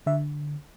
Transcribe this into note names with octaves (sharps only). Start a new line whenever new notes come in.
D3 E5